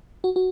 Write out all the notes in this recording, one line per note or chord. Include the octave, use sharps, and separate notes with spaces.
F#4
F#4